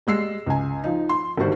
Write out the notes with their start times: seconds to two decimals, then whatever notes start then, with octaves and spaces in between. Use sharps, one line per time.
0.07 G3 G#3 E6 C7
0.46 C#2 G#5
0.84 F3 D#4
1.09 C6
1.37 G#1 D3 G3 F#4 C5